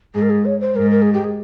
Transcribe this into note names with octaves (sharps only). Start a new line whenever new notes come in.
G#2 G#4
A#4
G#4
C#5
C5
G#2 A#4
A#4
G#4
G4
G#4